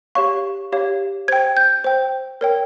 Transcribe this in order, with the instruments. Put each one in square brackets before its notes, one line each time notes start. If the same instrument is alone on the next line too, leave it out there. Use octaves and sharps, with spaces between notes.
[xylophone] G4 C#5 F5 C#6
G4 C#5 F5
C5 G5 G#6
G6
C5 G5
A#4 C#5 G5